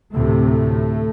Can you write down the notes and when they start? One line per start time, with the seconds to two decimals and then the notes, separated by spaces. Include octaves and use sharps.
0.14 D2 A2 C3 A3